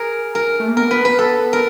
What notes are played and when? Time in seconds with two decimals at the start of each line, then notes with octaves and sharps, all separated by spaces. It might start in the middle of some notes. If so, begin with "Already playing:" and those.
Already playing: G#4 A#4
0.35 A#4
0.60 A3
0.68 A#3
0.76 B3 A#4
0.91 B4
1.05 B4
1.18 B3 A4
1.39 B3
1.53 A#4